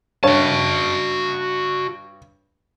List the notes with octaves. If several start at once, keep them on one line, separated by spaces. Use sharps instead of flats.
G2 F#4 C#5 A5